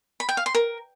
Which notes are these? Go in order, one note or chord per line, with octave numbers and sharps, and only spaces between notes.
B5
G5
F5
C6
A#4